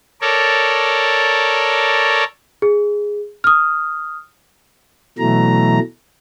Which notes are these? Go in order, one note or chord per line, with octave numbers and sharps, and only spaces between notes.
A4 A#4 C#5 D5
G#4
D#6 F6
B2 E3 F#3 A3 A#5